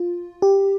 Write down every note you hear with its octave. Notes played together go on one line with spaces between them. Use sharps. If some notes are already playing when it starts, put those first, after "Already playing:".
Already playing: F4
G4